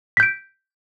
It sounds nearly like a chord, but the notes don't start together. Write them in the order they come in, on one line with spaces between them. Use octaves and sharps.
B6 G6 D7